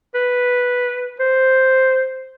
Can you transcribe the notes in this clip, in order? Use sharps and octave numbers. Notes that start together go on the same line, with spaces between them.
B4
C5